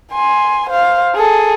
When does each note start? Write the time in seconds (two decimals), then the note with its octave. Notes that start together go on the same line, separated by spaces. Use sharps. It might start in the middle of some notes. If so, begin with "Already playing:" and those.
0.12 G#5 C6
0.70 C5 F5
1.15 G#4 A4